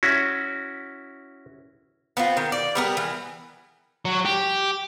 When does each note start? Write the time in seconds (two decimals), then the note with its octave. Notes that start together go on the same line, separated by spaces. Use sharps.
0.03 C#4 E4 F#4
2.17 B3 C4 F4
2.37 D#3
2.52 D5
2.75 G3 B3 A#4
2.97 E3
4.05 F#3
4.25 G4